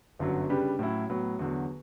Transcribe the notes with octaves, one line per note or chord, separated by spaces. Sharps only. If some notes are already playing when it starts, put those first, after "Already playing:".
G1 F#2 D3 F#3
C#3 G3 D4 G4 B4
A2 F#3 C#4 E4
A2 F#3 B3
E2 D3 F#3